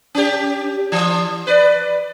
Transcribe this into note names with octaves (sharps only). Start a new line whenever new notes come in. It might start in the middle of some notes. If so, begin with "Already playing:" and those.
C#4 G4
E3
B4 D5